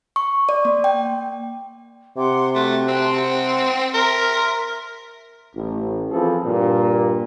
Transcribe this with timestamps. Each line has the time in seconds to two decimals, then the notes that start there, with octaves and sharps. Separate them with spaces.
0.16 C#6
0.49 D5
0.65 A#3
0.84 G5
2.17 C3 F#5 C6 D6
2.55 A3 F#4
2.88 C4 A5 C6 F#6
3.13 F#5
3.94 A#4 E5 C6 F6
5.55 A1
6.10 E3 F3 C4 G#4 A4
6.44 G2 A#2